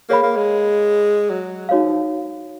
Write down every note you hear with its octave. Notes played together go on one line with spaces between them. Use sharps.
A#3 G#4 C#5 F5 B5
A#3
G#3
F#3
G#3 D#4 F#4 C#5 F5
F3